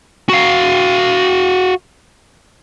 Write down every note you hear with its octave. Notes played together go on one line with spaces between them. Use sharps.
F#4 F5